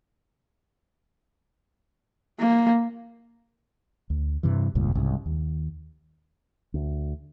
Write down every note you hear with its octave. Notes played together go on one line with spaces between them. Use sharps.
A#3
D2
G2 C3 E3
E1 C#2 G2 A#2
C2 G#2 C#3
D#2
D2